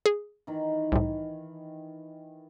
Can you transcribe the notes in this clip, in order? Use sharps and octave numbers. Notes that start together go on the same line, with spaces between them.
G#4
D#3 E3
C2 A2